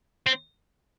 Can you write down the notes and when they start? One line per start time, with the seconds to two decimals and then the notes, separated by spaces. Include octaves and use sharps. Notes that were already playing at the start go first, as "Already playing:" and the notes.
0.27 C4